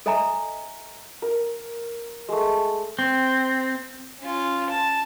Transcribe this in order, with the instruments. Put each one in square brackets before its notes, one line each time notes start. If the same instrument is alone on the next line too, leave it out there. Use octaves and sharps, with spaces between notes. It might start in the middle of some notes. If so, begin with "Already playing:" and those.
[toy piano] A4 D#5 E5 G#5 A#5
[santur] A#4
G#3 A3
[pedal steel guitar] C4
[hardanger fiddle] C#4 F4
A5